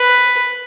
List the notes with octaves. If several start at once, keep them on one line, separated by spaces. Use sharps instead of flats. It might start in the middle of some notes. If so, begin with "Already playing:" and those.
Already playing: B4